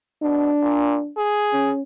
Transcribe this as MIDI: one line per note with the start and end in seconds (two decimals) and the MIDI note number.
0.23 0.50 47
0.23 1.12 62
0.62 0.96 46
1.17 1.72 68
1.53 1.82 61